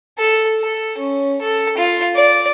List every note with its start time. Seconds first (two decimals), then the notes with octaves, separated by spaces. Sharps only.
0.19 A4
0.61 A4
0.99 C#4
1.42 A4
1.78 F4
2.16 D5